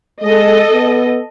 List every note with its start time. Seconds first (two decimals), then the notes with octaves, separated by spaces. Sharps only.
0.22 G#3 A4 D#5
0.73 B3